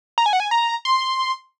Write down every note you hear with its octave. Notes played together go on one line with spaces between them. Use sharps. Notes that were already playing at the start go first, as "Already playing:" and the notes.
A#5
G#5
F#5
G#5
A#5
C6